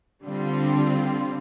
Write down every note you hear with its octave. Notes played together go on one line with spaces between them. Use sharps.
D3 G3 C4 F4